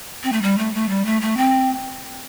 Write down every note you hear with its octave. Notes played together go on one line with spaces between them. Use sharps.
C4
A3
G3
A3
A3
G3
A3
A3
C4